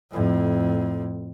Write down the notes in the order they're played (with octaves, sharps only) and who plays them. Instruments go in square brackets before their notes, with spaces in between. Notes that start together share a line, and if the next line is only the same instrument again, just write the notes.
[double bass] F2 A2